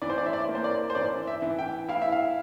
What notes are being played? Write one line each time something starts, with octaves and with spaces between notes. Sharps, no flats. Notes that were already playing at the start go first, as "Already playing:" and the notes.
E3 D5
C5
D5
E5
D5
A#3
C5
D5
C5
E3 D5
E5
E3
G5
E4 F5
E5
F5